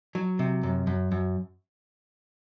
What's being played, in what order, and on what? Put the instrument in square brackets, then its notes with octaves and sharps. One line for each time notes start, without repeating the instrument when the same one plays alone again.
[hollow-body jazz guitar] F#3
C3
F#2
F#2
F#2